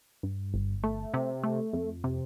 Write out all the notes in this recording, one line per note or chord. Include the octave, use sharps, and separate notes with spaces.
G2
G1
A3
C3
A3
F2
C3